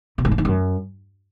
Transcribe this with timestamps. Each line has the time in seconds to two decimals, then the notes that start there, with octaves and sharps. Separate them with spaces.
0.18 B2
0.25 G#2
0.31 E3
0.38 D#3
0.45 F#2